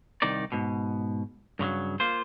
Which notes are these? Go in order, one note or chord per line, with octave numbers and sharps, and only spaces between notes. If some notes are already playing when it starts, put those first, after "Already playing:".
C2 D#3 D#4 D5
G#2 B2
G2 C#3 F3 F#3
A#3 F4 C5